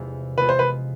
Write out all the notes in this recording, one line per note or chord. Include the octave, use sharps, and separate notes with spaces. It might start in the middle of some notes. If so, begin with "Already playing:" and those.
Already playing: F1 E2 C3 G#3
C3 G#3 B3 F4 B4
C5
B4